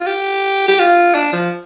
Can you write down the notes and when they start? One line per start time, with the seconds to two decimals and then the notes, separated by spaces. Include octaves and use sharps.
0.01 F4
0.06 G4
0.68 G4
0.79 F4
1.14 D4
1.33 F3